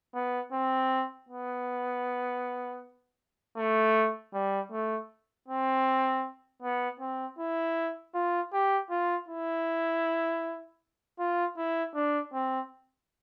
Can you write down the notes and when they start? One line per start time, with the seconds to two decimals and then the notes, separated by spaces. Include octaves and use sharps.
0.15 B3
0.53 C4
1.29 B3
3.57 A3
4.34 G3
4.72 A3
5.48 C4
6.62 B3
7.00 C4
7.39 E4
8.15 F4
8.53 G4
8.90 F4
9.29 E4
11.19 F4
11.57 E4
11.95 D4
12.34 C4